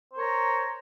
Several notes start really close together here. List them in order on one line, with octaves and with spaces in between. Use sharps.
C5 A#4 C#5 A#5